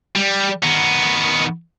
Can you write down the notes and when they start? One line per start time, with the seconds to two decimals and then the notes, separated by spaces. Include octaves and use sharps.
0.15 G3
0.63 D#3 B3